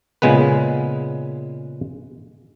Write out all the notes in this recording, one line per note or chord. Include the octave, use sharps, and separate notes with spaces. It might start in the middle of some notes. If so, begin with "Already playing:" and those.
A#2 C#3 G#3 B3 B4